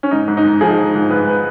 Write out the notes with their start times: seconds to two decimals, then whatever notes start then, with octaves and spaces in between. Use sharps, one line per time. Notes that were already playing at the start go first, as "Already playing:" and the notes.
0.03 C#4
0.11 G#2 D#4
0.28 G#2
0.37 D#4
0.45 G#2
0.61 F3 G#4
0.77 F3
0.95 G#2
1.10 G#2 B4
1.28 B4